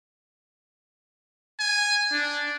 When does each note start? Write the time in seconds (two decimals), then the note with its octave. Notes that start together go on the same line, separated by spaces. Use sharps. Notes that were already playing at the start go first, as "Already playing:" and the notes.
1.60 G#5
2.12 D4